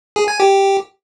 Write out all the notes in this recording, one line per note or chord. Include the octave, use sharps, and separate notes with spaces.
G#4
G#5
G4